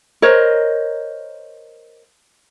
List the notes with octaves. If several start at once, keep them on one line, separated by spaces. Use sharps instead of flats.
A#4 C5 C#5 D#5